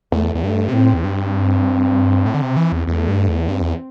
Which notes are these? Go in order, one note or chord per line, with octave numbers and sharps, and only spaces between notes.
E2 A3
E2
G2 A3
C3
A2 C4
E2
G2 C4
A2
D3
C3
E3
E2
E2 A3
G2
E2
G2 C4
E2